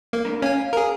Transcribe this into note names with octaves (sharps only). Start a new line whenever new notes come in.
A#3
A3 D4 A#4
C#4 F5 G#5
G#4 A#4